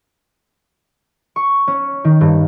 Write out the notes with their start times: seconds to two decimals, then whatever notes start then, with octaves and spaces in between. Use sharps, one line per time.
1.36 C#6
1.67 C#4
2.04 D#3
2.21 G2